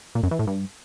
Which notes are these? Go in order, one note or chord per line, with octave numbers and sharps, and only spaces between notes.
A#2
F#2
E3
A2
G2